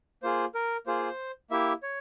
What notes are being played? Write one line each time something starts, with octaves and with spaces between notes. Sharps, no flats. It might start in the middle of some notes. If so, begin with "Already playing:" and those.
A#3 F4 G#4 C5
A#4
A#3 F4 G#4 C5
A#3 E4 G4 E5
C#5